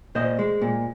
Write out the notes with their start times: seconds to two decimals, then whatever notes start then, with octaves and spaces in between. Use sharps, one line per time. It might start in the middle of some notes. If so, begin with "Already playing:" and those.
0.15 A#2 C5 D#5
0.39 G#3
0.62 A#2